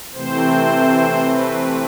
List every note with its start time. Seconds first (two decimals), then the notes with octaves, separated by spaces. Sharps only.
0.14 C3 E3 A3 C4 C5
1.24 B4